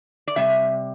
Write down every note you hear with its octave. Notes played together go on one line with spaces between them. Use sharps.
D5
C3 G3 E5